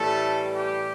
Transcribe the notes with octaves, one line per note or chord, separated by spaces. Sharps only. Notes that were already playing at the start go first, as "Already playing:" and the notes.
Already playing: A2 E3 G3 A3 A4
G4